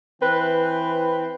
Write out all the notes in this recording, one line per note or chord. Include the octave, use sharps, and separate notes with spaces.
E3 C4 B4